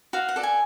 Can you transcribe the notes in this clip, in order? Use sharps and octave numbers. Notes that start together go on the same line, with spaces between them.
F#4 F5
F#5
A4 D5
G#5